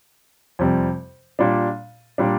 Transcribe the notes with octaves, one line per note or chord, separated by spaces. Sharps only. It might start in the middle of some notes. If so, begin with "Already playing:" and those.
F2 C3 G3
A#2 G3 D4
A#2 G3 D4